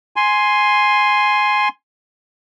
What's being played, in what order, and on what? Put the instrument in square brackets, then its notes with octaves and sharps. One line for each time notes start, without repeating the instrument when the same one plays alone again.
[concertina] G#5 C6